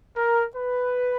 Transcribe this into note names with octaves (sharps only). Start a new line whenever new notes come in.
A#4
B4